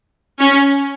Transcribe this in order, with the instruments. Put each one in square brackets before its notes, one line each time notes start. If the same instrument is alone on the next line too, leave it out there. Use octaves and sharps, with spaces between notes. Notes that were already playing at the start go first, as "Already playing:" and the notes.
[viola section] C#4